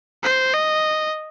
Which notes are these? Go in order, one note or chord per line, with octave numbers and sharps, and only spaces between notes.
C5
D#5